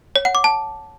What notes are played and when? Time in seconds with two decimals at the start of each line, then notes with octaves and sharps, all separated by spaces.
0.16 C#5
0.25 F#5
0.35 D6
0.44 A5